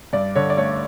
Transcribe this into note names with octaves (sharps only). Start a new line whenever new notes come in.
G2 D5
D3 C#5
D5
A3 C#5